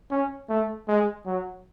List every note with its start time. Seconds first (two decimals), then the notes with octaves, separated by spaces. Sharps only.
0.11 C#4
0.49 A3
0.88 G#3
1.26 F#3